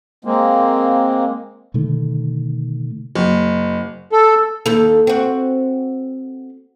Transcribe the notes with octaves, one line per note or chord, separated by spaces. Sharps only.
G#3 A#3 C4
B2 D3 D#3 A3
F#1
A4
D#2 A4
C4 F#4